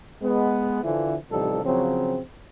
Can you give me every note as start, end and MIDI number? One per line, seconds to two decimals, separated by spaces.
0.22 0.81 56
0.22 0.81 59
0.83 1.15 50
0.83 1.15 52
0.83 1.15 53
1.31 1.61 33
1.31 1.61 48
1.31 1.61 53
1.31 1.61 55
1.31 1.61 63
1.31 1.61 69
1.64 2.20 49
1.64 2.20 53
1.64 2.20 54
1.64 2.20 60